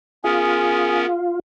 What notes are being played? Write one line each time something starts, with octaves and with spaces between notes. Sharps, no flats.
B3 C#4 F4 G#4 A#4